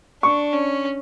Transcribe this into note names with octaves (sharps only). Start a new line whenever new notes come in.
D4 C#6
C#4